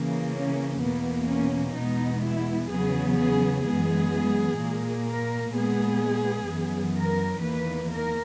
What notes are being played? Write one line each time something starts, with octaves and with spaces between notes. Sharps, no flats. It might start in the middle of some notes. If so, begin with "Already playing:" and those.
Already playing: C#3 E3 A#3
C#4
E2 B2 A#3 B3
C#4
E2 B2 G#3 B3 D#4
E4
E2 C#3 F#3 B3 G#4
G#4
F#2 E3 G#3 B3 G#4
A#2 A#3
A#4
A#2 G#3 B3 G#4
F#2 E3 B3
A#4
E2 D#3 A#3 B4
A#4